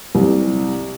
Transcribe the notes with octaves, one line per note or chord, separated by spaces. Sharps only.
C2